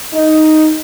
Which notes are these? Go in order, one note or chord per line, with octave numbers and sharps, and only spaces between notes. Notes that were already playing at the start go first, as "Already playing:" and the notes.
D#4